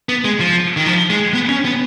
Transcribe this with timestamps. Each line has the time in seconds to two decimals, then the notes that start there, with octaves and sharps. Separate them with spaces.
0.09 B3
0.25 G#3
0.40 F3
0.77 D#3
0.87 F3
1.10 G#3
1.34 B3
1.49 C#4
1.65 B3